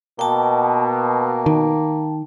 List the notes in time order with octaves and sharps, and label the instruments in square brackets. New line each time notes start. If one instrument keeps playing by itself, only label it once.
[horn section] B2 [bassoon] A#3 [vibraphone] G5 A5
[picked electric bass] D#3